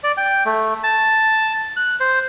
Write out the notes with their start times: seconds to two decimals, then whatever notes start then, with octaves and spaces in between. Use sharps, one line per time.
0.04 D5
0.17 G5
0.46 A3
0.84 A5
1.77 F#6
2.00 C5